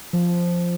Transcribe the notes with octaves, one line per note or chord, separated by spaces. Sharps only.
F3